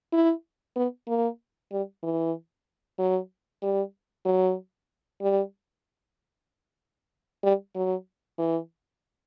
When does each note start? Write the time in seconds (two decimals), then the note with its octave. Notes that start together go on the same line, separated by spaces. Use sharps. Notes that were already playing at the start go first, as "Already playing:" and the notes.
0.13 E4
0.76 B3
1.08 A#3
1.72 G3
2.03 E3
2.99 F#3
3.63 G3
4.25 F#3
5.21 G3
7.44 G3
7.75 F#3
8.38 E3